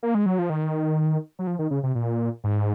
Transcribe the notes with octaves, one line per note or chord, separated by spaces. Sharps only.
A#3
G#3
F#3
F3
D#3
F#3
F3
D#3
C#3
C3
A#2
G#2